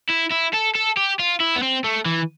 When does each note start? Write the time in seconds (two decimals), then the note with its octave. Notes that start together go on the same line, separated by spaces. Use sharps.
0.10 E4
0.32 E4
0.54 A4
0.75 A4
0.97 G4
1.19 F4
1.40 E4
1.56 B3
1.62 C4
1.84 A3
2.06 E3